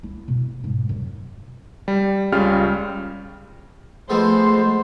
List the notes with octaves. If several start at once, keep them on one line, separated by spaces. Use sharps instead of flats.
E4
B2
G#2
F#2
G3
C#2 C#3 G3 F4 F6
F3 G#3 A3 B3 C5